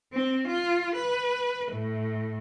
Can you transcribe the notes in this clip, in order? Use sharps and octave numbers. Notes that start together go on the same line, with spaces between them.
C4
F4
B4
A2